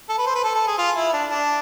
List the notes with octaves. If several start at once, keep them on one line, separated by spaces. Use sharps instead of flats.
A4
B4
C5
B4
A4
A4
G#4
F4
E4
D4
D4